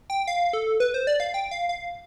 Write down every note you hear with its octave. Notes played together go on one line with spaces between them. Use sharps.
G5
F5
A4
B4
C5
D5
F5
G5
F5
F5